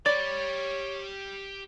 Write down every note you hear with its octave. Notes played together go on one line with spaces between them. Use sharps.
G4 C#5 D5 B5 A6